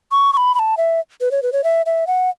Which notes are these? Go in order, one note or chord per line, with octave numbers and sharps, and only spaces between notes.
C#6
C#6
B5
B5
A5
E5
B4
C#5
B4
C#5
E5
E5
F#5